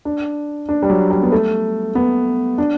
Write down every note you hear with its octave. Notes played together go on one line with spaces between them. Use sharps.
D4
D4
G3
F#3
G3
B3
A3
B3
D4